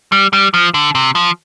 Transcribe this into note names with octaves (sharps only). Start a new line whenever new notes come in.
G3
G3
F3
D3
C3
F3